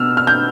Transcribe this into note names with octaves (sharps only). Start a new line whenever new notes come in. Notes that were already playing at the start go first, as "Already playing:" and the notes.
Already playing: B2 B3 E6 F6
F6
G6